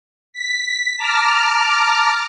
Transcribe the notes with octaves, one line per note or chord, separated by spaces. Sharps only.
B6
A5 A#5 D6 F6